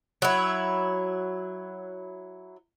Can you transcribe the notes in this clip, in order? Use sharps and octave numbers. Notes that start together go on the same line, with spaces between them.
F#3 E4